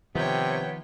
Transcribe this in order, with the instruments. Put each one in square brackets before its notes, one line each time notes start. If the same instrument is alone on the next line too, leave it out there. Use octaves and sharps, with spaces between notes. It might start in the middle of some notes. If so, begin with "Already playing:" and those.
[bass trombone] C3 [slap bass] D#3 F3 [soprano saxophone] B3 [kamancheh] C#5 G5